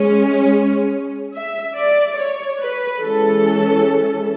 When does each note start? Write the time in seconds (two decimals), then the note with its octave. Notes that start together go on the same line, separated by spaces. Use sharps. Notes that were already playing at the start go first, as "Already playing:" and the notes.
Already playing: G#3 C#4
1.34 E5
1.77 D5
2.18 C#5
2.61 B4
3.03 E3 G#3 C#4 A4